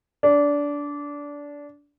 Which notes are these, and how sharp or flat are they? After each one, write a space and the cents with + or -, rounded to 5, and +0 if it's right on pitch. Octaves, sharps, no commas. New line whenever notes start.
D4 -20